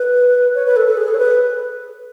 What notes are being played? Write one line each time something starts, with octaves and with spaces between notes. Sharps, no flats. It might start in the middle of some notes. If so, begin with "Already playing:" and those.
Already playing: B4
C#5
B4
A4
A4
G#4
A4
C#5
B4